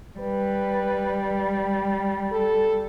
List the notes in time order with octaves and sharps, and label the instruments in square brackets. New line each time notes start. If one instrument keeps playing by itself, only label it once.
[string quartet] G3 [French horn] B4
[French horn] A4